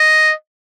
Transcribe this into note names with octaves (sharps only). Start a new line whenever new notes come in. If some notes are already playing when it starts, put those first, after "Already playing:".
Already playing: D#5